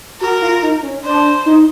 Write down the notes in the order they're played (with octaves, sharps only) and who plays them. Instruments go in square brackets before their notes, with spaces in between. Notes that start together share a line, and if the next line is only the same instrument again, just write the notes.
[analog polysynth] F#4 [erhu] A#4
[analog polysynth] F4
D#4
C#4
[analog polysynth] D4 [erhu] C5
[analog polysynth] D#4